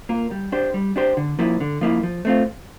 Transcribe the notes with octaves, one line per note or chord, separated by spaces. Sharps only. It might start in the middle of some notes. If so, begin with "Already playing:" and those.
A#3 F4 A#4
G3
D4 G4 C5
G3
D4 G4 C5
D3
F3 A#3 E4
D3
F3 A#3 E4
F3
A3 C4 F4